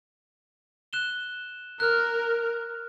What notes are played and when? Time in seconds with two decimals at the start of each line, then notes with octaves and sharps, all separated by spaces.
0.93 F#6 E7 G7
1.80 A#4 F6 F#6